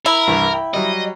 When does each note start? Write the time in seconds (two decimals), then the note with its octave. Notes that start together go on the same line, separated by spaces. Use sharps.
0.06 E4 A#4
0.27 C2 G2 E3
0.53 G5
0.74 F#3 G3 D#5